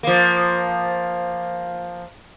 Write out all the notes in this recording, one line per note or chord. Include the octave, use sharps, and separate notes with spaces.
F3 A#3